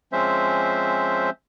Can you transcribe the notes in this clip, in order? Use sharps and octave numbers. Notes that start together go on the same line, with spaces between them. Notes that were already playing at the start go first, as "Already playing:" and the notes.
F3 G#3 C4 C#4 C5 E5